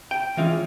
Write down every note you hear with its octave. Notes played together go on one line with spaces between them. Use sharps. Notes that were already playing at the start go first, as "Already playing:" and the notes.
G5
E3 G#3 C#4 F4